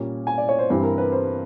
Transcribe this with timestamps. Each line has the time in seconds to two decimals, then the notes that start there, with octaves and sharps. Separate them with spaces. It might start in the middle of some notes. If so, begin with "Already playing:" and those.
Already playing: A#2 G3 A#3 C#4
0.27 G#5
0.38 D5
0.49 C#5
0.59 C5
0.70 G2 E3 G3 C4
0.83 A#4
0.98 B4
1.12 C5